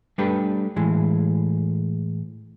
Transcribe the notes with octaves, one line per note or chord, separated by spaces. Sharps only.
G3 A3 D4 G4 A4 B4
A2 E3 G#3